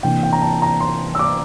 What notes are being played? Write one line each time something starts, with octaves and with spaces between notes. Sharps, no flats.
C3 E3 A#3 D4 G5
G5
A#5
A5
A#5
C6
E6
D6